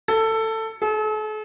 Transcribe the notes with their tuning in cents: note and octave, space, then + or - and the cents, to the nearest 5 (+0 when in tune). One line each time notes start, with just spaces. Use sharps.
A4 +15
A4 -45